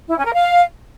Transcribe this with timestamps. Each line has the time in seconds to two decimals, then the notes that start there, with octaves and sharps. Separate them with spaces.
0.08 E4
0.16 C#4
0.24 A#4
0.33 F5